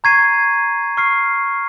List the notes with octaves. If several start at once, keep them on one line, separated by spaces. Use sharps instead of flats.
A#5 C#6 G#6 C7 D#7
C#6 F6 C7